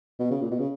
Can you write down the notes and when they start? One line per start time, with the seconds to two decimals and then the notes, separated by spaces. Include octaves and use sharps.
0.19 B2
0.31 C#3
0.41 A#2
0.51 B2
0.59 C#3